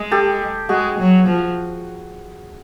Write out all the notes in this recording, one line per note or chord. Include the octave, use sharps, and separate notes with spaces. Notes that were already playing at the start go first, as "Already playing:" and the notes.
Already playing: G#3
G4 A4
G#3 F#4 G#4
F#3
F3